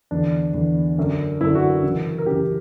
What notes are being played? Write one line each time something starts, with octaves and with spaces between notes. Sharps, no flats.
E2 D3 D4
E2 D3
F#2 D3
F#2 D3 E4
F#4
F#2 C#3 E3
A#4
F#2 C#3 E3 G4